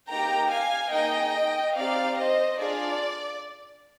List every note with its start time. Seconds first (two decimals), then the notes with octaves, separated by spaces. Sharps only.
0.09 A#3 D#4 G4 G5 A#5
0.51 F5 G#5
0.92 A#3 D#4 G#4 D#5 G5
1.76 C4 D#4 G4 D5 F5
2.17 C5 D#5
2.60 D4 F4 G#4 D5